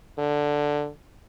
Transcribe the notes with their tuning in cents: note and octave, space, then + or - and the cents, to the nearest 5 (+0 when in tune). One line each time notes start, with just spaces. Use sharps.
D3 +0